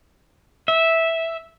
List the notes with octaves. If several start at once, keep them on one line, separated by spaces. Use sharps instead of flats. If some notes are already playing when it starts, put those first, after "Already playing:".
E5